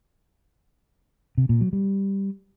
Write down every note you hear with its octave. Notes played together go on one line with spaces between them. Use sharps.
C3
A#2
F#3
G3